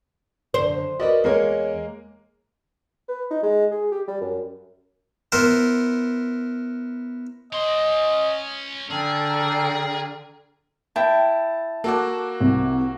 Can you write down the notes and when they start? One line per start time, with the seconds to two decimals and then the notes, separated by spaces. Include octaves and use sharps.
0.54 F#2 D3 C5
1.00 F#4 A#4 B4 D5 D#5
1.24 E2 G#3 A#3 A#4 C#5
3.08 B4
3.31 D#4
3.43 G#3
3.71 G#4
3.91 G4
4.08 G3
4.21 F#2
5.32 B3 E4 A#4 C5
7.53 C#4 D#5 C6
8.91 D3 G#4 A4 G5 A#5 F6
10.96 E4 G5 A5
11.84 A#3 F#4 A4 F#5 D6
12.40 C2